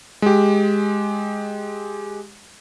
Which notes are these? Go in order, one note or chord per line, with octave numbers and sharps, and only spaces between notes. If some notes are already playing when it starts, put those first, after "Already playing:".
G#3 G4